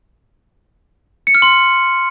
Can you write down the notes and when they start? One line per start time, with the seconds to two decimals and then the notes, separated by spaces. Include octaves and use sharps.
1.27 C#7
1.35 F6
1.42 C6